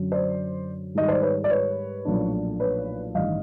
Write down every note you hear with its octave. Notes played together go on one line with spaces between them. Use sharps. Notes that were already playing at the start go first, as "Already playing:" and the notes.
Already playing: F#2 D3 F#3
C5 D5
G#2 D#3 G3 D#5
C5 D5
B4 C#5
D5
B4 C#5
B1 A#2 F3 A3 D4
B4 C#5
A1 G2 D#3 D#5 F5